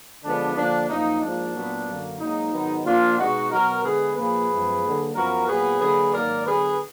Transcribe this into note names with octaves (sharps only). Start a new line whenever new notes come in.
D3 F3 G#3 B3 D4
D3 F3 A#3 D4
F#2 F3 A#3 D#4
G#2 F3 A#3 D4
A#2 F#3 B3
F#2 D3 F#3 A#3
G#2 F#3 A#3 D#4
G#2 D#3 F#3 B3
A#2 F3 A#3 D4 F4
B2 G#3 B3 D#4 F#4
B2 F#3 B3 F#4 A#4
D3 G#3 B3 G#4 B4
A#2 F3 A#3 G#4 B4
F#2 F3 G#3 B3
D3 F#3 A#3
F#2 F3 B3 F#4 A#4
A#2 F#3 B3 G#4 B4
D3 F#3 A#3 G#4 B4
G#2 D#3 F#3 A#3 A#4 D5
D3 F#3 B3 G#4 B4